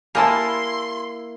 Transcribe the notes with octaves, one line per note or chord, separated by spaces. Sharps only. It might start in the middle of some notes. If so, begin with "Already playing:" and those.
A#3 E4 G4 D#5 G#5 A5 B5 C6